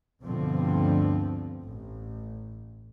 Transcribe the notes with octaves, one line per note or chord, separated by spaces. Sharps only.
D2 G2 B2 D3 F3 C4
A1